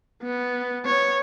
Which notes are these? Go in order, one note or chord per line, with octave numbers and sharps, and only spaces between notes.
B3
B3 C#5